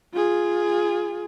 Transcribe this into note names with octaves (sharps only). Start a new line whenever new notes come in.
F4 G#4